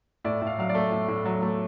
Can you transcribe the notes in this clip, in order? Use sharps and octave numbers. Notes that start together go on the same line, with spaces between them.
A2 D5
A2
F5
F#3 F5
D5
A3
A2
A2
F#3
A3